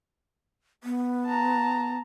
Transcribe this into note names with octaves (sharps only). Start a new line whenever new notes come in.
B3
A5 A#5